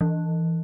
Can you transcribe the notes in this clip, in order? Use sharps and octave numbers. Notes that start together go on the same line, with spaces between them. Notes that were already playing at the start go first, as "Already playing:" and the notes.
E3